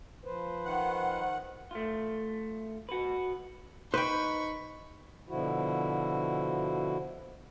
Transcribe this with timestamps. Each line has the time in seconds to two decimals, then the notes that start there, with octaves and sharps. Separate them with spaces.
0.24 F3 B4 C5
0.65 D#3 F#5
1.71 A3 F4
2.89 F#4 B4
3.94 D#4 B4 C5 G5 B5 C#6
5.29 B2 D3 F3 E4 F#4